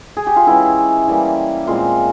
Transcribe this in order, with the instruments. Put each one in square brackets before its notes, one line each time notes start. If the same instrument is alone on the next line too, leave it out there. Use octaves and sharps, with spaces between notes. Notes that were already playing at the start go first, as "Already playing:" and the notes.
[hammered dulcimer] G#4
G4
F4
E3 G#3 C#4 E4
E3 G3 A#3
A#2 G#3 C4 F4